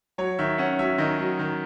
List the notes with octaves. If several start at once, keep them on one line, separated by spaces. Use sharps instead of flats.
F#3 C#5
D#3 E5
C#4 F#5
F#3 E5
D#3 D#5
F#3
D#3